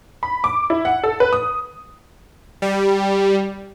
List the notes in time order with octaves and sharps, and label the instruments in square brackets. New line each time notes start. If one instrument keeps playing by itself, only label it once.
[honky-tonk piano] B5
D6
E4
F#5
A4
B4
D#6
[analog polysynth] G3